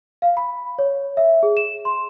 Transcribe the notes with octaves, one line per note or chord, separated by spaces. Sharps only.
F5
B5
C#5
E5
G#4
E7
C6